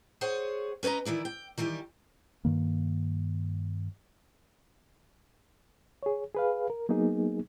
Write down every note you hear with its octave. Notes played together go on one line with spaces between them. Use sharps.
G#4 C5 C#5 F#5
C#4 B4 C#5 D#5 A#5
D#3 E3 E4 D5
G5
D#3 E3 G3 G4
G2 D#3 A#3
G#4 C#5
G#4 B4 F5
A#4
F#3 A#3 B3 D#4 G#4